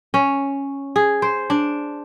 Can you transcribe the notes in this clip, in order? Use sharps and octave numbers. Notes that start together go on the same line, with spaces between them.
C#4
G#4
C5
D4